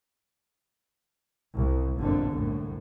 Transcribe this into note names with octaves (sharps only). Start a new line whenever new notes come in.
C2
G1 F2 A#2 D3
C2 F#2 A2